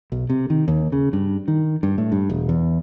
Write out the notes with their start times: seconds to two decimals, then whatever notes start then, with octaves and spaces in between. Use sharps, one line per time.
0.12 B1
0.30 C3
0.50 D#3
0.68 D#2
0.92 C#3
1.13 G2
1.48 D#3
1.83 G2
1.98 A2
2.12 G2
2.29 E1
2.49 E2